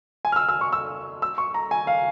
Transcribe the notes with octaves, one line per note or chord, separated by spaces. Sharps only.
G#5
F6
E6
E6
C#6
E6
E6
C#6
A#5
G#5
F5